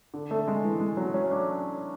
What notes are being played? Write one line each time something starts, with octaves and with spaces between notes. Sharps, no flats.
D3
A3
G#3
E3
G#3
F#3
C#4
D4